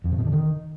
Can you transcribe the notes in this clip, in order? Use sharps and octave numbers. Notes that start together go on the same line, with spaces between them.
F2
C3
B2
D3
D#3